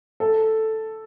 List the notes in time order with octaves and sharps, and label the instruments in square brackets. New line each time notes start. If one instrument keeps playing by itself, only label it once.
[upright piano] A4